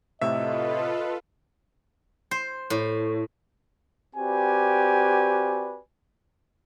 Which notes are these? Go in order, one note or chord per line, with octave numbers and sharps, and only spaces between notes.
A2 C3 A3 F4 A4 B4 D#5 E5
C5
A2
C4 F#4 G4 B4 D5 G#5